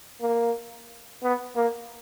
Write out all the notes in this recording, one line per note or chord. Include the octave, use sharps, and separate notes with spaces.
A#3
B3
A#3